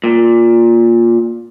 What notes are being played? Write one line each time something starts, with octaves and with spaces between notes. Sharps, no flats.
A#2